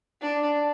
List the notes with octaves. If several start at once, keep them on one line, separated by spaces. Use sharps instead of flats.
D4